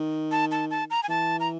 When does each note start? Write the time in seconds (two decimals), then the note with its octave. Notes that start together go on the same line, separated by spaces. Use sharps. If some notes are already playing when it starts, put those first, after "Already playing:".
Already playing: D#3
0.31 A5
0.51 A5
0.71 A5
0.90 A#5
1.03 G#5
1.09 E3 A5
1.40 A#5